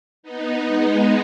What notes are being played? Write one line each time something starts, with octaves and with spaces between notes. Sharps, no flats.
B3 D#4
G#3 B3